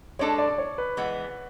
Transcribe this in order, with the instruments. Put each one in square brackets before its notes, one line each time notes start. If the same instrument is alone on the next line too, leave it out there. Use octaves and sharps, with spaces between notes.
[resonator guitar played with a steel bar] G#3 D4 A4 [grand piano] C#5
[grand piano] D5
C#5
B4
[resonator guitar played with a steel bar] E3 G#3 B3